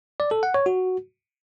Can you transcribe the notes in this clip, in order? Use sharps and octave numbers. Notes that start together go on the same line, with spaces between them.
D5
A4
F#5
C#5
F#4